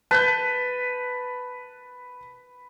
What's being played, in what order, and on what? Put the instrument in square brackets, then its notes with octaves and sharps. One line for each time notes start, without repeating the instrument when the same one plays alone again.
[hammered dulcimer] B4 [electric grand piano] A5 G6